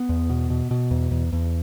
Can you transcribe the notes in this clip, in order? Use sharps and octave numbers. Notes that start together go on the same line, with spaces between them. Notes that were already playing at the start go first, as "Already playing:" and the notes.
Already playing: B3
E2
B2
B2
B2
E2
E2
E2